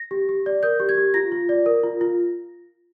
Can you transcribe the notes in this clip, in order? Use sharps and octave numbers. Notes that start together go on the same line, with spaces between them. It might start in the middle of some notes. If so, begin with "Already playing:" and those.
Already playing: A#6
G4
G4
D5
A#4 G6
G4
G#6
G4
F4 A#6
F4
D5
A#4
F4
F4